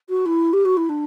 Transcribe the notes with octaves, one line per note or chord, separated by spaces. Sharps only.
F#4
E4
G4
F#4
E4
D4